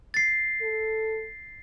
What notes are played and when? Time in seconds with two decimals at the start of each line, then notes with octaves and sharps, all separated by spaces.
0.14 A6 C7
0.62 A4